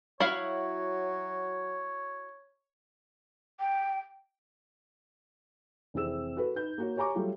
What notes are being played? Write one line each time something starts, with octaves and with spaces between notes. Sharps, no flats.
F#3 E4 F#4 C#5 F5
G5
F1 E3 C4 G#4 E6 E7
F#4 A4 B4
D#4 B4 G6
A#3 F#4 C#5
G4 C#5 G#5 A#5 C#6 D6
F#3 G3 A3 F4 G4